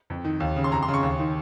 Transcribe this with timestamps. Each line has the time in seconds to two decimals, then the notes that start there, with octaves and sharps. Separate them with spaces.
0.10 F2
0.25 D#3
0.40 D#2
0.56 C#3
0.64 C6
0.72 F2 A#5
0.83 C6
0.88 C#3
0.94 C#6
1.03 D#2
1.19 D#3